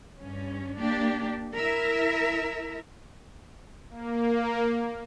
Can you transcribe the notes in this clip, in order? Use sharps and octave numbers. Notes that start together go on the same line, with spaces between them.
G2 C#4
A#3 D4 G4
E4 A#4 E5
A#3